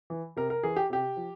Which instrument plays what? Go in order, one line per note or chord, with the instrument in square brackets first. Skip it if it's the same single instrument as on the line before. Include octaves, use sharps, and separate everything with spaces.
[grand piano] E3
C3 A#4
A#4
E3 G#4
G4
C3 G4
F3